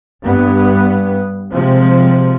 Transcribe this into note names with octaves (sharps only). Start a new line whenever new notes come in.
G2 B3
C3 F3 G#3